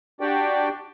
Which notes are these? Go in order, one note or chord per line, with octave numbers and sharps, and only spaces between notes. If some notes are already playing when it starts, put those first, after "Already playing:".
D4 F#4 G4 D5 G5